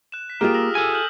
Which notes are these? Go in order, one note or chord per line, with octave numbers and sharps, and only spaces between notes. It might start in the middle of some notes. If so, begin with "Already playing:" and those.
F#6 E7
B6
A#3 F4 G4 G#4 D#6 F6
D#6 E6 A#6
A4 G#5
F6 G6 F#7